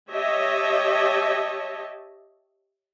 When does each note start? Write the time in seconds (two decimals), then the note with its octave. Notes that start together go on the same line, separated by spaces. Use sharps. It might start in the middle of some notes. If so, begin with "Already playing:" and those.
0.11 G4 C#5 D#5 E5 A5